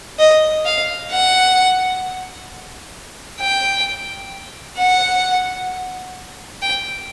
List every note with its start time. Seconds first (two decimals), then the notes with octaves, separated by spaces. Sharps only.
0.19 D#5
0.65 F5
1.11 F#5
3.41 G5
4.78 F#5
6.62 G5